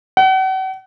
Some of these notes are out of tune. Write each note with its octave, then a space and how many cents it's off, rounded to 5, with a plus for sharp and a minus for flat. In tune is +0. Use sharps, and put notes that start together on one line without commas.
F#5 +40